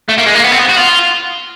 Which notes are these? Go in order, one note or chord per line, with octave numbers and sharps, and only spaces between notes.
A3
A#3
G#3
A#3
B3
C4
B3
F#4
F4